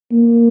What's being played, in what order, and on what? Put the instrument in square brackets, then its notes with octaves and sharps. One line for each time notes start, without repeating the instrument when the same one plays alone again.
[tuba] A#3